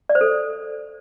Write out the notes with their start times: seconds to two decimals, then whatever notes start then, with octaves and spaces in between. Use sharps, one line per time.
0.09 D5
0.15 C5
0.21 A4